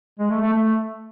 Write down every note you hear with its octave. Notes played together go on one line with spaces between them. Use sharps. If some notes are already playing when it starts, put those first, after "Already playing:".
G#3
A3
A3
A3